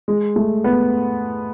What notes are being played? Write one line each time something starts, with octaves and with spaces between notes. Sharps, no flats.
G#3
A3
B3